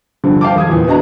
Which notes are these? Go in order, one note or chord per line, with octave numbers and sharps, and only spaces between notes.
G2 D3 F3
C5 F5 G5 A5 D6
F1 D#6 G#6
E2 A#2
B3 D4 F#4 D#5 A5 A#5